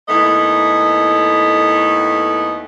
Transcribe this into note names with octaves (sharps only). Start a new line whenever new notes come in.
D#2 A3 B3 E4 D#5